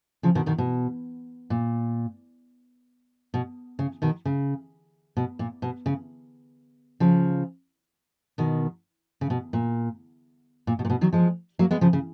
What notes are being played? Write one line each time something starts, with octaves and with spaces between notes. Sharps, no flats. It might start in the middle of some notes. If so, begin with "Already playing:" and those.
C#3 F3
B2 D#3
B2 D#3
B2
A#2
B2
C#3
B2 D#3
C#3
B2
A#2
B2
C#3
C#3 F3
B2 D#3
C#3
B2
A#2
A#2
B2
A#2
B2
D#3 F#3
F3 G#3
F#3 A#3
G#3 B3
C#3 F3
C#3